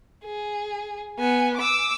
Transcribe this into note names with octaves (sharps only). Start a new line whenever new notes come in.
G#4
B3 G#5
D6 E6